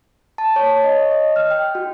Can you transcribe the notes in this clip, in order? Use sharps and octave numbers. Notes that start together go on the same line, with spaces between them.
A5
C#5
D#5
D#5
F6
G5
F#4